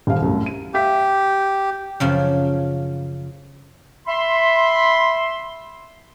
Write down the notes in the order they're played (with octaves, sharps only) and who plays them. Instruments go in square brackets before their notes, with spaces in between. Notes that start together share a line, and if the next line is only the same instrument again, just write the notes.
[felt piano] D#1 D#2 F5
C2 F#2 A2
D#7
[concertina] G4 [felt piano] E5 F5 B6
[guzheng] F#2 C#3 F3
[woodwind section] E5 B5 C6